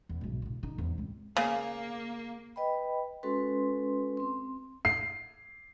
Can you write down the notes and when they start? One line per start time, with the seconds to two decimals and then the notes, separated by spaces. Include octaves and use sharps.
0.09 E2
0.21 B1 G#2
0.42 D3 E4
0.63 D3 D#4
0.78 E2 G#2
0.98 C#2 C4
1.37 C#3 A#3
2.56 B4 D#5 G5 B5
3.23 G#3 C#4 F#4 A4 B4 C6
4.17 C4 C6
4.85 C7